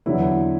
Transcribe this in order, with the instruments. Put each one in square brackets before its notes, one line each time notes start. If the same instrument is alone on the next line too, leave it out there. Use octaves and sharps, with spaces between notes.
[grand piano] E2 D3 F#3 B3 E4